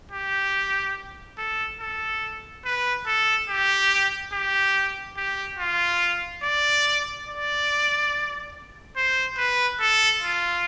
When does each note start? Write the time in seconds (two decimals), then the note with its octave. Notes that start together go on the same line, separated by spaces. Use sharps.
0.11 G4
1.38 A4
1.81 A4
2.65 B4
3.06 A4
3.49 G4
4.33 G4
5.17 G4
5.59 F4
6.43 D5
7.27 D5
8.97 C5
9.38 B4
9.80 A4
10.22 F4